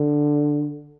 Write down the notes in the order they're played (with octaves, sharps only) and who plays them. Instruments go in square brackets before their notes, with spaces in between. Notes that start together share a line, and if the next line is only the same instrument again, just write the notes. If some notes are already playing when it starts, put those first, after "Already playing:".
Already playing: [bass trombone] D3